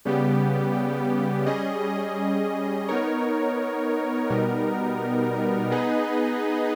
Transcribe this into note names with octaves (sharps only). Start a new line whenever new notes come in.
C#3 G3 B3 G4
G3 C#4 G#4 D#5
B3 D#4 A#4 C#5
B2 G3 B3 D#4 A#4
B3 D#4 G#4 B4 D#5